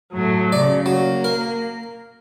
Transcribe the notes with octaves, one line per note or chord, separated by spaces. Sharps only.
A2 F#3 A3
C#3 D5
F#3 A#3
A#4